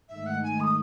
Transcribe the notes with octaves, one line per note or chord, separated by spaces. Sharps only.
G#2 D#3 A3 D#4 E5
F#5
G#5
D#6